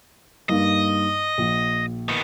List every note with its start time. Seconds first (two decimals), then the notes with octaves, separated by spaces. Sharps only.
0.49 G2 A#3 D#4 D#5
1.38 A#1
2.09 D#3 B3